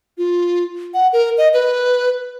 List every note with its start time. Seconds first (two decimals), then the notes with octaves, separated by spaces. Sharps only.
0.18 F4
0.94 F#5
1.13 A#4
1.38 D#5
1.54 B4